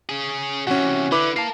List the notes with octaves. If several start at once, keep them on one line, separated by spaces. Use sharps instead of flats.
C#4 G#4
C3 E3 C#4 F#4
D3 E4 B4 D6
A#4 F5 A5 C7